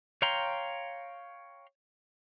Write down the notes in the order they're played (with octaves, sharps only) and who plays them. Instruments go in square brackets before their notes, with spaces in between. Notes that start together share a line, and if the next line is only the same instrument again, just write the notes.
[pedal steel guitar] C#5 F5 G5 A#5 C6